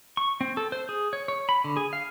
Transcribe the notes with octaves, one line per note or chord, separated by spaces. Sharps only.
C#6
C4
A4
C5
G#4
C#5
C#5
B5
D3
G#4
F5